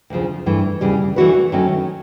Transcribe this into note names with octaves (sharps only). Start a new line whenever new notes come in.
D2 C#3 F3
G2 E3 A3
D#2 C#3 E3 G3
E3 A3 D4 F#4 B4
D#3 F#3 A3 C#4